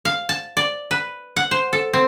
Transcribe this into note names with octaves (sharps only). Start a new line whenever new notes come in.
F5
A5
D5
B4
F#5
C5
A4
C4